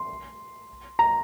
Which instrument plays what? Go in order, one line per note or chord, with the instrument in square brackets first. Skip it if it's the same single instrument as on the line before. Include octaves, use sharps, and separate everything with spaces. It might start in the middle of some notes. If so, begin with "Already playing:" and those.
Already playing: [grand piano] C6
A#5